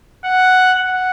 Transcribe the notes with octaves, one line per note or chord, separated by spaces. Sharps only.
F#5
F#5